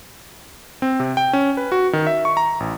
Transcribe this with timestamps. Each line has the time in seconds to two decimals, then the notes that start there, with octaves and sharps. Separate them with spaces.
0.82 C4
1.00 C3
1.17 G5
1.33 C#4
1.57 B4
1.72 F#4
1.93 D#3
2.07 E5
2.25 C#6
2.37 A#5
2.60 A1